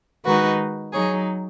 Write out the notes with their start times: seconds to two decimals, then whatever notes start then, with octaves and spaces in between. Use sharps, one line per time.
0.25 D#3 G#3 D#4 F#4 B4
0.92 F#3 D#4 G#4 C#5